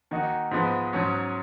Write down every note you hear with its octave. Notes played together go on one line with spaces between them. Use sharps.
D#3 A#3 D#4 F#4
G#2 F3 G#3 B3
G#2 F#3 C#4